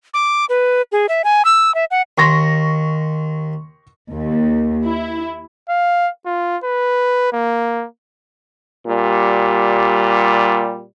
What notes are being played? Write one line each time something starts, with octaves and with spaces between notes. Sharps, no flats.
D6
B4
G#4
E5
G#5
E6
E5
F#5
D#2 C6 C#6 A#6
D#2
E4
F5
F4
B4
A#3
A#2 G3